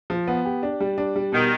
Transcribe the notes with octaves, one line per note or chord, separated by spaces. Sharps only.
F3
B3
G4
D4
G3
D4
G3
B2 D#3